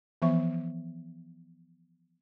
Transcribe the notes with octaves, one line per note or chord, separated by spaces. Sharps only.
E3 F3 B3 E5 C#6